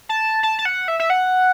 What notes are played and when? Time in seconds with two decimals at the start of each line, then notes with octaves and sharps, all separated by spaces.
0.09 A5
0.43 A5
0.59 A5
0.65 F#5
0.88 E5
1.00 E5
1.10 F#5